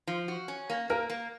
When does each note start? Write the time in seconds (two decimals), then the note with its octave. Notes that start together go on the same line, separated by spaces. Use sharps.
0.07 F3
0.28 F#4
0.48 C#4
0.70 A#3
0.90 A#3 A#4
1.10 A#3